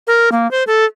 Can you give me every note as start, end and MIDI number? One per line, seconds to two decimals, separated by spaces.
0.07 0.29 70
0.32 0.50 58
0.51 0.63 72
0.67 0.85 69